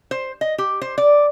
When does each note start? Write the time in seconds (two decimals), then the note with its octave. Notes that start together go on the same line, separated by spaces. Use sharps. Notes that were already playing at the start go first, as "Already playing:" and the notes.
0.11 C5
0.41 D#5
0.58 G4
0.82 C5
0.98 D5